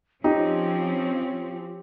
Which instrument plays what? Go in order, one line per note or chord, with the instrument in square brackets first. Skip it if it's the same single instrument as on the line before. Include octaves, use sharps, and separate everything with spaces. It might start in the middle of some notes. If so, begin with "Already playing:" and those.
[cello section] F3 C4 C#4 [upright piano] D#4 [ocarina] F4 [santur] G4